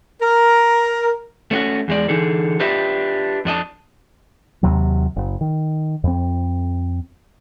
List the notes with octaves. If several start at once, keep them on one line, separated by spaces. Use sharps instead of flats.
A#4
A3 C#4 F4 F#4
E2 G#3 D5
D3 E3 D#4 G#4 A4
D4 F4 G4 B4 D#5 E5
F2 D4 D#5 A5
D#2 C3 F#3
F#1
D#3
F2 C4